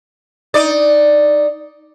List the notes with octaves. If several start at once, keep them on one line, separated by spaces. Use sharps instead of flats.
D#4 D5